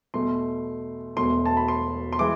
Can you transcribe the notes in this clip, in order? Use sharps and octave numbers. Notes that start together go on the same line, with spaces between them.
E2 B2 A3 C6
E1 E2 B2 A3 C6
A5
B5
C6
C6
E3 G#3 D6